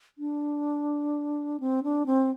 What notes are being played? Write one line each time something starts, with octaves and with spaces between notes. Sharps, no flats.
D4
C4
D4
C4